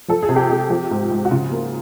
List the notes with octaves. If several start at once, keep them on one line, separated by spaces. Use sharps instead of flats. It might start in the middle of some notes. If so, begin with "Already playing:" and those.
F3 A4
G#4
C3
G4
C3 G#4
F3 G4
G#2
G#2
F#4
C#3 F4
A#3